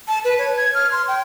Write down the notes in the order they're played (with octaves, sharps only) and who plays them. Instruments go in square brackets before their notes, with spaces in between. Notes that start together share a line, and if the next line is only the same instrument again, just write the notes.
[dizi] A5
B4
C#5
G#6
F6
C6
G5